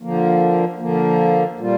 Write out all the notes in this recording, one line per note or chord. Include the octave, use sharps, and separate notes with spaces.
D3 F3 A#3
D3 F3 A#3
A#2 G3 A#3 F4